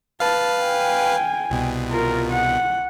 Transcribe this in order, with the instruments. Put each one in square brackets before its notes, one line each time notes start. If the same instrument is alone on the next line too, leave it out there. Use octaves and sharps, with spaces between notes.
[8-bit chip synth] B4 F5 [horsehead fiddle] A5
[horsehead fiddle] G5 G#5
[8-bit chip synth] C2 B2
[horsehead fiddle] F4 A#4
F#5